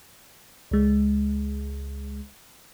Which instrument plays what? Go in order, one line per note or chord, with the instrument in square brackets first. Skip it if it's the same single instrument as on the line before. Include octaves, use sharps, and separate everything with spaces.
[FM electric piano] C#2 G#3